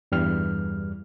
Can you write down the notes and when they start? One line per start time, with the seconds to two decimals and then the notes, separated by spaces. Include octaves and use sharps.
0.12 E2 G2 G3 F6